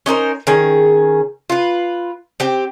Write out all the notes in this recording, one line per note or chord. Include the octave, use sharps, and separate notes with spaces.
C#4 D#4 A#4 C5
D#3 C#4 G#4
F4 B4
C4 G4